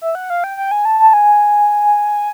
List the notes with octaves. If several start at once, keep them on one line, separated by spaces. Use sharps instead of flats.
E5
F#5
F5
G5
G5
G#5
A5
A5
G#5